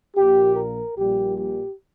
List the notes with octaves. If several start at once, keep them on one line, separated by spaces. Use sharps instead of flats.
A#1 A#2 A#3 G4
A#4
A#1 A#2 G3 G4
G4